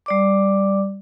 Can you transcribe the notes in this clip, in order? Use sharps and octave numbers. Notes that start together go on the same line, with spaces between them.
G3 D5 D6